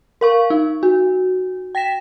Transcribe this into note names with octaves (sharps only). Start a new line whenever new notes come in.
A#4 F5 C#6
D#4
F#4
G5 A#6 B6 E7